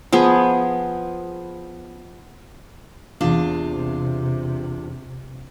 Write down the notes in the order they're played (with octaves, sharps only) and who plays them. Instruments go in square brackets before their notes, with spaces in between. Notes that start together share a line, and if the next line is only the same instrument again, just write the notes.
[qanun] F3 B3 G#4
[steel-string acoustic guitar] E2 D4 F4 [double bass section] C3